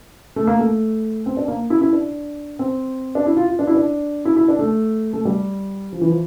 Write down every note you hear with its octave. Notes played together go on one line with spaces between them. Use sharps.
A3
A#3
A3
C4
D4
A#3
E4
E4
D4
C4
D4
E4
F4
F4
D4
E4
D4
E4
E4
D4
A3
A3
G3
F3
E3
F3